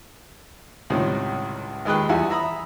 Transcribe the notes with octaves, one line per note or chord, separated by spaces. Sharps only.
C#2 A2 C3 D#3 G3
D#2 D#3 G#3 B4 G5 F#6
E2 E3 G3 E5 F#5
E5 A#5 B5 D#6